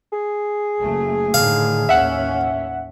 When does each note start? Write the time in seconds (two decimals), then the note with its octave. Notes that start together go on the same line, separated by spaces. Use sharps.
0.13 G#4
0.80 F#1 A3
1.34 A2 D3 D#3 F5
1.89 A1 D#2 C#4 E5 F#5